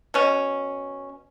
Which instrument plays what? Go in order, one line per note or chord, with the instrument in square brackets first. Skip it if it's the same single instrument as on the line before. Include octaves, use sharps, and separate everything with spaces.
[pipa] B2 C#4